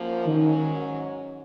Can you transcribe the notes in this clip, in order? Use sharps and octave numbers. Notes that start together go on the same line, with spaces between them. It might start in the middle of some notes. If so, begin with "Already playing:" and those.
Already playing: F#2 F3 A#3
G#2 D#3 F#3 C#4